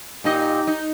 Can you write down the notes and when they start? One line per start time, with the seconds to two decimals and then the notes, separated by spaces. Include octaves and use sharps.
0.24 A#2 D#4 G4 D#5
0.67 D#4